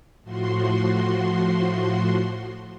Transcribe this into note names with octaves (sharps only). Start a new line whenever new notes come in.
A2 F3 F#4 C6